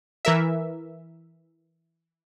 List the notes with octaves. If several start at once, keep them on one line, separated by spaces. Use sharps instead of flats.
E3 A#4 E5